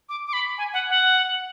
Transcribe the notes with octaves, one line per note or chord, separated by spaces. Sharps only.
D6
D6
B5
G#5
F#5
F#5